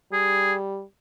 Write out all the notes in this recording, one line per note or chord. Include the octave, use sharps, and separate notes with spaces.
G3 G#4